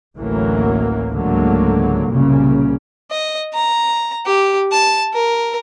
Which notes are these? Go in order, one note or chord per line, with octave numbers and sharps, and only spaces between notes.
A1 D2 A2 E3 F#3 A#3
C#2 G#2 D3 F#3 A3 A#3
C2 F#2 A#2 C#3
D#5
A#5
G4
A5
A#4